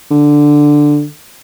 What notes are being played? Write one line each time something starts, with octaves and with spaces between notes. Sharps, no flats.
D3